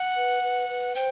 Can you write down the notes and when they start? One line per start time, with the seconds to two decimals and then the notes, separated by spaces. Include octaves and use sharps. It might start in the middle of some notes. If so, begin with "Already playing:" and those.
Already playing: F#5
0.16 B4
0.43 B4
0.69 B4
0.95 C5 G5